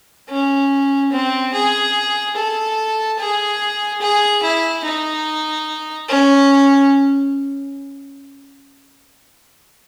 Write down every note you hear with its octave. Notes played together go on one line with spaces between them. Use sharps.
C#4
C4
G#4
A4
G#4
G#4
E4
D#4
C#4